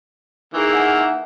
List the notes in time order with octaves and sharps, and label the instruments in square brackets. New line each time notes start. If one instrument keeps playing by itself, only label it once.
[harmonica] D#3 E3 A#3 [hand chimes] G#4 E6
[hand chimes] E5 F#5 G#5
E5